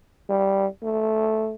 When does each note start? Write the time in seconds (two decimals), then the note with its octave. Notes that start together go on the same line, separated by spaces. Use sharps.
0.29 G3
0.83 A3